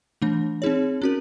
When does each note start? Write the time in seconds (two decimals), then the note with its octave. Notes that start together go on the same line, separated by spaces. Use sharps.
0.22 E3 A3 D4
0.62 C4 D#4 G#4 C#5
1.02 C#4 F#4 A#4